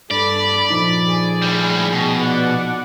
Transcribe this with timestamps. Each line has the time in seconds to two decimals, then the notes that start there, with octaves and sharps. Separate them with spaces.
0.11 G2 A4 D5 B5
0.70 A#2 F3 D#4
1.07 G#4
1.42 A2 G3
1.92 B2
2.22 D5 F#5